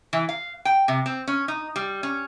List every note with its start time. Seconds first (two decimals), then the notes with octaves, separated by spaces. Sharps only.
0.13 E3
0.29 F5
0.65 G5
0.88 C3
1.06 C4
1.28 C#4
1.48 D#4
1.76 G3
2.03 C#4